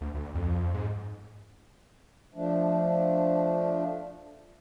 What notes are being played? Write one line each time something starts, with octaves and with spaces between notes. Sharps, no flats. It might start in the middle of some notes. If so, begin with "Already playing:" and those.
D2
D2
F2
G#2
F3 A3 D4